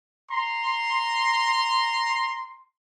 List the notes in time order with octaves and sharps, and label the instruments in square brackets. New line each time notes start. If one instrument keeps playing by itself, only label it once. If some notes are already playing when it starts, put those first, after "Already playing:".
[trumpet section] A#5 C6